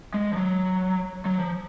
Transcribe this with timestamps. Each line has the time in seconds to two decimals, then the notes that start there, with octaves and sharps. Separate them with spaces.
0.14 G#3
0.33 F3
0.37 F#3
1.25 F#3
1.39 F3